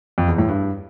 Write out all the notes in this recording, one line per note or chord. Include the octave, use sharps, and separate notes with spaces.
F2
E2
A2
G2